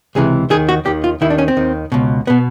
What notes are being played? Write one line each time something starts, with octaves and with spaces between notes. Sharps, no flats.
C#2 C3 E3 G#4
D#2 D#3 G#4
F#4
D#2 D#3 G4
F4
D#2 D#3 E4
D4
C#4
C4
D#2 D#3
C#2 B2
B2 B3